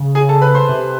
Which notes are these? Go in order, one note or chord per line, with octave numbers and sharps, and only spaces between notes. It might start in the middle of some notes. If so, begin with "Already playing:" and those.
Already playing: C#3
G#4 G#5
A4 A5
B4 B5
C5 C6
C3